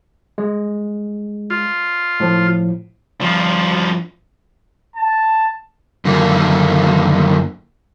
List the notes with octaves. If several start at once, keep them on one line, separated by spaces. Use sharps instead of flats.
G#3
F4
A2 F3
G2 F3
A5
F#2 D3 D#3 A#3 F4